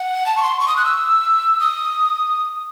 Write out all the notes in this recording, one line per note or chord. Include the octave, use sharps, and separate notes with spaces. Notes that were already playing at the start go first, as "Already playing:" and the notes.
Already playing: F#5
A5
C#6
C6
C#6
D#6
F#6
E6
D#6